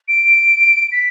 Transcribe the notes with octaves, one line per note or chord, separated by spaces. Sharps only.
D7
B6